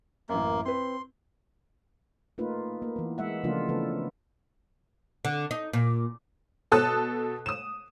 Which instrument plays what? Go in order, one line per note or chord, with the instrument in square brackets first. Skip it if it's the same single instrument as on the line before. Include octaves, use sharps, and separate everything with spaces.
[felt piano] A1 F#2 [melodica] A#3
[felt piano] C4 B4 [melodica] C6
[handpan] A3 A#3 D#4 F4 B4
A#3
E3 B3
G#3 E5 F#5
C#3 F3 A3 A#3 D4 F4
C#3 E3 A3 B3 A4 B4
[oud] D3
D#4
A#2
[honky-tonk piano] B2 A4 A5 D#6 F#6
D#6 E7